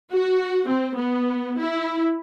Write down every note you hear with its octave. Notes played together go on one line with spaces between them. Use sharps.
F#4
C4
B3
E4